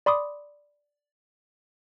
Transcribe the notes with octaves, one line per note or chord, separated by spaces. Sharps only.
D5 B5 C6 D6 D#6